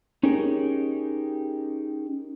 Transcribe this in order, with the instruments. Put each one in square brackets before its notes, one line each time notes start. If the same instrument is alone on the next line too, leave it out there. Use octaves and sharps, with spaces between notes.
[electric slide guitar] C#4 D#4 G4 G#4 A#4